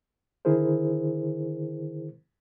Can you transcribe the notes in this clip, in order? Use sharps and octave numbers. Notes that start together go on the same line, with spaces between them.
D3 D#3 E4 G#4 A#4 C5